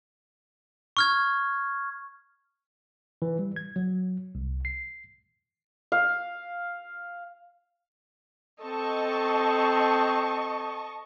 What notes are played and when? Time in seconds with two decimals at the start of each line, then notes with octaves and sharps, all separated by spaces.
0.97 C#6 F6 G#6
3.22 E3
3.39 G3
3.56 G#6
3.76 F#3
4.35 C2
4.65 C7
5.92 F5
8.63 C4 A4 D#5 A5 C#6